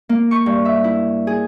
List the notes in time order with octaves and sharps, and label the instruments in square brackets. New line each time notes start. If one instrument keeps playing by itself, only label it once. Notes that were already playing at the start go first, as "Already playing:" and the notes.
[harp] A#3
C#6
G2
E5
E4
G#4